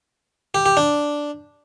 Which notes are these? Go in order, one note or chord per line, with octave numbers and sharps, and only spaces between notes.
G4
G4
D4